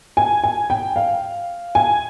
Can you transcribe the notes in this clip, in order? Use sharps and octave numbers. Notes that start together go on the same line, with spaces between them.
G#5
G#5
G5
F5
G#5